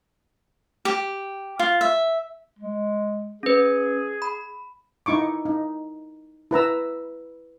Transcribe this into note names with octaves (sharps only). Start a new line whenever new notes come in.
G4
F4
E5
G#3
C#4 G#4 B4
B5
D#4 E4 C#6 D6
D#4
E4 B4 A#5 E6